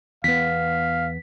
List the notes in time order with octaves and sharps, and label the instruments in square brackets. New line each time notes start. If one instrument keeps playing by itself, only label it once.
[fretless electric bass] E2 B3 [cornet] F5 [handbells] B6